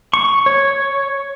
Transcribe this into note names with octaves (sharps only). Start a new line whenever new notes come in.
C#6
C#5